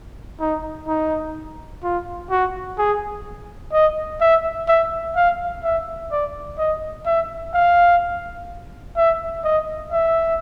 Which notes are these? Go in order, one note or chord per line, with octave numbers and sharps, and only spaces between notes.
D#4
D#4
F4
F#4
G#4
D#5
E5
E5
F5
E5
D5
D#5
E5
F5
E5
D#5
E5